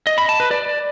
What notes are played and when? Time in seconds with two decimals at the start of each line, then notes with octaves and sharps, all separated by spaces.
0.07 D#5
0.18 B5
0.29 A5
0.40 B4
0.51 D5